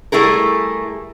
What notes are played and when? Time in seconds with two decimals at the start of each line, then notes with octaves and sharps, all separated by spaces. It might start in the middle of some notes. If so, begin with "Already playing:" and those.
0.12 G3 A3 E4 G#4 A#4